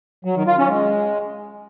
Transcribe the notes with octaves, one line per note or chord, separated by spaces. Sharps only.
F#3
D#3
F4
C#4
G#3